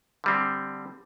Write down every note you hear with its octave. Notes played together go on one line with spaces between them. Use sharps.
D3 G3 C4